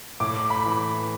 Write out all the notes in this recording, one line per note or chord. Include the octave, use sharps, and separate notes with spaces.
A2 D6
B5
E3